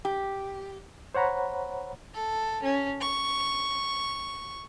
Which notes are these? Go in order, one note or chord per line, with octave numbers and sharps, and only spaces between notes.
G4
C5 C#5 F#5 A#5 B5
A4
C#4
C#6